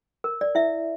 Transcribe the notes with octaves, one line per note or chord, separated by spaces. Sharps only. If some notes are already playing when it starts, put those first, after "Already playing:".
A#4
D5
E4 E5